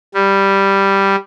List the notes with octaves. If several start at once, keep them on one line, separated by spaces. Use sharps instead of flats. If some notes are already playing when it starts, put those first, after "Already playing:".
G3